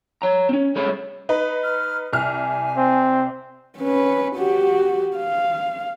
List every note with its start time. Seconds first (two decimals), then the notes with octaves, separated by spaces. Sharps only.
0.22 C#5 A#5
0.49 C4 C#4
0.75 C2 G#3 A3 G#4 C#5 B5
1.29 D#4 B4
1.63 F6
2.13 C2 G#5 F6
2.77 C4
3.78 C#4 B4
4.36 F#4 G4
5.17 F5